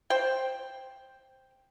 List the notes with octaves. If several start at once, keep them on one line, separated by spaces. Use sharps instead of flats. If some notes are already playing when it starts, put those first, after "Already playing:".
C5 G5